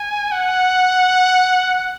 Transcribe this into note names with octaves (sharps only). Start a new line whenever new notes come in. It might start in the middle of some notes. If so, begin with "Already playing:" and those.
Already playing: G#5
F#5